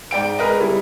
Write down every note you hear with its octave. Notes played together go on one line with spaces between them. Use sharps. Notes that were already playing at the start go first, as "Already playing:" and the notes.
G#2 D5 G5 D7
G#4 A#4 B4 D#5
G3 E4